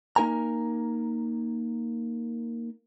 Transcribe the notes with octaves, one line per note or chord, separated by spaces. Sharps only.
A#3 D#4 A#4 G#5 A#5